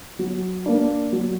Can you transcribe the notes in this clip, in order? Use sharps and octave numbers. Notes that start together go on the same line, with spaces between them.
F#3
A#3 D4
F#3